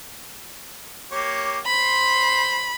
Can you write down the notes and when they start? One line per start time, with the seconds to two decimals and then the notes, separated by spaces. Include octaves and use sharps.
1.12 A#3 G4 C#5
1.66 C5 B5 C6